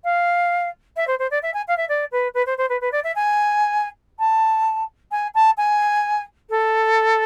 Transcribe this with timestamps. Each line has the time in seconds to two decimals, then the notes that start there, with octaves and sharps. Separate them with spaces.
0.04 F5
0.97 E5
1.07 C5
1.19 C5
1.31 D5
1.43 E5
1.54 G#5
1.68 F5
1.77 E5
1.89 D5
2.12 B4
2.34 B4
2.46 C5
2.58 C5
2.69 B4
2.81 B4
2.92 D5
3.04 E5
3.15 G#5
4.19 A5
5.11 G#5
5.35 A5
5.57 G#5
6.50 A4